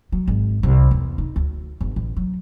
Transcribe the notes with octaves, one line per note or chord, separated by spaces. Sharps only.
F#3
G#1
C2
E2
D#4
D2
G1
A1
F#3